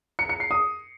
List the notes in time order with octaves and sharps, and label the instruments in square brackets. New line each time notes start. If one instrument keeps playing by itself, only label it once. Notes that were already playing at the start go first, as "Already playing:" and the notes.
[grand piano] C#7
C#7
C7
D#6